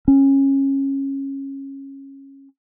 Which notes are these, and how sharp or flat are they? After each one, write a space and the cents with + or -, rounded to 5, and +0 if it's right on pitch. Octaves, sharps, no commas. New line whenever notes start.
C#4 -20